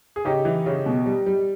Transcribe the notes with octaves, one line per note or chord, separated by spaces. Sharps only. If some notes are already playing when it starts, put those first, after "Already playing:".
G#4
C#3 D#4 G4
E3
C#3
B2
G3
G3